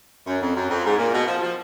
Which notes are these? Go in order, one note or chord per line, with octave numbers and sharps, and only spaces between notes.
F#2
F2
F#2
F2
G#2
A#2
B2
F3
F3